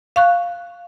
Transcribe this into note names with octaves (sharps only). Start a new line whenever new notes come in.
F5 C#6 F#6